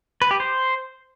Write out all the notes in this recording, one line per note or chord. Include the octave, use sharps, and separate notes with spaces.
B4
G4
C5